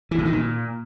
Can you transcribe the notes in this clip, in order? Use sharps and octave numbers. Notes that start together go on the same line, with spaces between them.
E3
A2
D#3
A#2